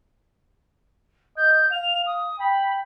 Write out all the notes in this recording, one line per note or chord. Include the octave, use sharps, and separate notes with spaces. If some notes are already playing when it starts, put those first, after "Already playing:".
D#5 G6
F5 F7
D#6
G5 B5